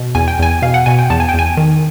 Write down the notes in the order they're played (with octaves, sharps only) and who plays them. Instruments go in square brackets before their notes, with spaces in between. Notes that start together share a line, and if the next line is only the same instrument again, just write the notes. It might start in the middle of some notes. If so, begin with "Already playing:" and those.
Already playing: [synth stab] B2
E2 G#5
G5
E2 G#5
B2 F5
F#5
B2 G#5
G5
E2 A5
G#5
G5
E2 G#5
D#3